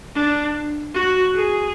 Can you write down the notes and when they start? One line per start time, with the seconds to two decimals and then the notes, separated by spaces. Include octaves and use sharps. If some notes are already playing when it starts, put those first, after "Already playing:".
0.15 D4
0.95 F#4
1.35 G#4